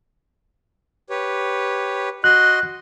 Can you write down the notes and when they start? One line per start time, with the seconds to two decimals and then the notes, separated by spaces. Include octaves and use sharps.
1.10 G4 B4 C#5
2.24 F#4 D#5 C6 F#6